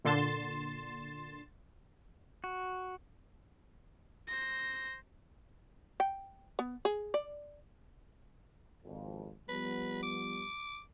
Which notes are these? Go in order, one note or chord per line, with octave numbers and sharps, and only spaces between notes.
A#2 D3 C6 A6 E7
F#4
C5 A#6
G5
B3
G#4
D5
G#1 F2
F3 G3 B3 B4
D6